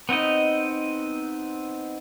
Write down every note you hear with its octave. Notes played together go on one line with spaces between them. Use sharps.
B3 C4 D#4 D#5